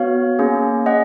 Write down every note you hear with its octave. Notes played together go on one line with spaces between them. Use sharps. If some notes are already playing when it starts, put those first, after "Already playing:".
Already playing: B3 F#4 C#5 F5
A#3 C#4 G#4
C#4 D#5 F#5